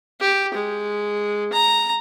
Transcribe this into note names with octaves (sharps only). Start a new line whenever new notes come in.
G4
G#3
A#5